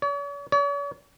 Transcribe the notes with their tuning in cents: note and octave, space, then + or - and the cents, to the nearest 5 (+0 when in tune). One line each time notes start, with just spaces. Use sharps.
C#5 +45
C#5 +45